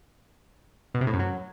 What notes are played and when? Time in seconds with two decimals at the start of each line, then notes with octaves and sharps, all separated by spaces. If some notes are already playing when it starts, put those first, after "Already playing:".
0.95 B2
1.01 C3
1.07 A2
1.13 F#2
1.19 F#3